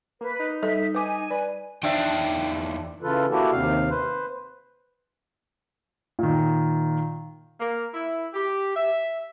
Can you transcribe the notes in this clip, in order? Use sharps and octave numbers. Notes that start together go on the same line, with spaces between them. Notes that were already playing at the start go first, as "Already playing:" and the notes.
A#3 B4
D#4
G3 A4 D#5 E5
B4 G#5 D6
B4 D5
E2 F3 D4 D#4 E5 G5
C#3 E3 F4 A4 B4
A#3 D4 E4 F#4 G4 A4
D#2 C3 F5
B4 C5
A#2 D#3
A#3
E4
G4
E5